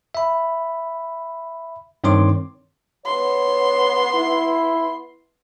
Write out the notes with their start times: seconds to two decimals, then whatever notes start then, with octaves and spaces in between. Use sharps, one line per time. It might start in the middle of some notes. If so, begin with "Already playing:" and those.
0.15 E5 B5
2.04 G2 D#3 C4 C#5 C6 D6
3.06 B3 C#5 C6
4.14 E4